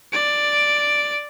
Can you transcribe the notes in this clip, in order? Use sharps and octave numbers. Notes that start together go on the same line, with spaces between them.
D5 D7